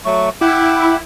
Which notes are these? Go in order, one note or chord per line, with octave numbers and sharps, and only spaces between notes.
F#3 A3 C#6
E4 F#5 G5 D6